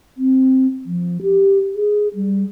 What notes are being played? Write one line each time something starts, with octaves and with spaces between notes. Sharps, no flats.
C4
F3
G4
G#4
G3